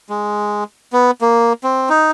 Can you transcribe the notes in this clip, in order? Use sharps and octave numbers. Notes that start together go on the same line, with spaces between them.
G#3
B3
A#3
C4
D#4